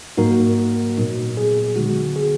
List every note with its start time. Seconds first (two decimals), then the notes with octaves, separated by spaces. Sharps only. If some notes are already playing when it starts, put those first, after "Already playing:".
0.17 G#2 F#3 A#3 D#4 F#4 A#4
0.97 A#2 F#3 B3 D#4
1.37 G#4
1.76 D3 G#3 B3 F#4
2.16 G#4